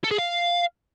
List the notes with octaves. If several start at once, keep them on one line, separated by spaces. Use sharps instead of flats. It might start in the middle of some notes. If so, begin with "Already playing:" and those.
A4
G#4
F5